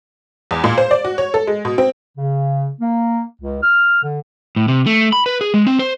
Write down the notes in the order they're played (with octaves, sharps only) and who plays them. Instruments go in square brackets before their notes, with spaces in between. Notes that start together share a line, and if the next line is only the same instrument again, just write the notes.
[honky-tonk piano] E2
A#2
C5
D5
F#4
C#5
A4
G#3
B2
C4
[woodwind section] C#3
A#3
C#2
F6
D3
[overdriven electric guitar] A2
C3
A3
B5
B4
G#4
G#3
C4
C5